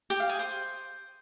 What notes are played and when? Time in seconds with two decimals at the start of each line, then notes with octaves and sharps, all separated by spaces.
0.10 G4
0.20 F5
0.29 G#4
0.39 C5